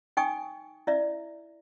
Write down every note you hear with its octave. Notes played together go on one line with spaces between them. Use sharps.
D#4 G5 G#5 C#6 D#6
E4 D5 E5